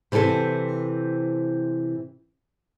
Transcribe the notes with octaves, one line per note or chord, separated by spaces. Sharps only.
C3 E3 C4 A4 C5